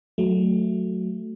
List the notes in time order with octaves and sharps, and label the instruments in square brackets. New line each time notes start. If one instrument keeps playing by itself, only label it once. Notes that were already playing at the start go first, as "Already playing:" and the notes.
[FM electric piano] F#3 A3